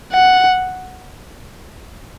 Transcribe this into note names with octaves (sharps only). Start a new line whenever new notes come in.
F#5